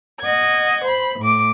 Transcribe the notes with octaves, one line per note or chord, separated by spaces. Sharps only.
D#5 F#5 G#6
C5 B5
A2 D6